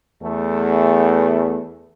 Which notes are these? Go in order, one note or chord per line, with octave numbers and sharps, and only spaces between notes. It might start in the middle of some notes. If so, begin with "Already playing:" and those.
E2 A3